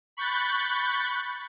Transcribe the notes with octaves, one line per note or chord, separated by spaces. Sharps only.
B5 C#6 F#6 G6 A6